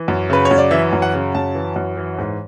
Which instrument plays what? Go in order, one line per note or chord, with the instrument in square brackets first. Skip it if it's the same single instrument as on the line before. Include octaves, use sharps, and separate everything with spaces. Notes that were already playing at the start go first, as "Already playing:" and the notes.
Already playing: [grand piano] E3
F#2
C#3 B4
C#5
F#2
D5
E3 E5
F#2
F#5
C#3
F#2 A5
E3
F#2
E3
G#2